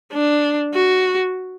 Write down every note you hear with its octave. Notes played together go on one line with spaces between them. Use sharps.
D4
F#4